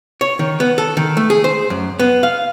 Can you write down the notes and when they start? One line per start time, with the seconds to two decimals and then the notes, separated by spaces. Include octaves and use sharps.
0.21 C#5
0.39 D#3
0.60 B3
0.78 A4
0.97 D#3
1.17 A3
1.30 G#4
1.44 C5
1.70 F#2
1.99 B3
2.23 F5